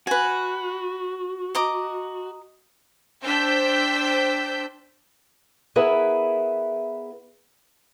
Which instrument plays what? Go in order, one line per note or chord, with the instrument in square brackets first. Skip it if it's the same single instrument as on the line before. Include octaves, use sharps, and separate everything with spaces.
[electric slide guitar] F#4 [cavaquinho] B4 G#5
[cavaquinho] D#5 A#5 D6
[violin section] D4 C5 G5 E6 G6 B6
[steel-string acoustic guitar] B3 E4 G#4 A#4 B4 E5